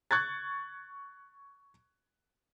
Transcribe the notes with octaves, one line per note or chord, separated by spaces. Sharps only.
C#6 F#6 G#6 A6